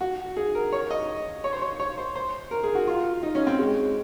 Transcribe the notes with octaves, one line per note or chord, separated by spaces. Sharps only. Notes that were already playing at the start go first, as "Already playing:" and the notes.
F#4
G#4
A#4
C#5
D#5
C#5
C5
C#5
C#5
C5
C5
A#4
G#4
F#4
F4
D#4
C#4
C4
G#3